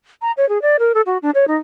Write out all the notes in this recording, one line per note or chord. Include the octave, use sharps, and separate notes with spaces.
A#5
C#5
G#4
D5
A#4
A4
F#4
D4
C#5
D#4